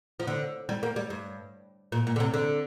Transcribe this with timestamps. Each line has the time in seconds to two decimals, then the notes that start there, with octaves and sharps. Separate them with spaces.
0.20 F3
0.27 D3
0.69 G3
0.83 A#3
0.96 G3
1.10 G2
1.92 A#2
2.07 A#2
2.16 D3
2.20 C3
2.34 D3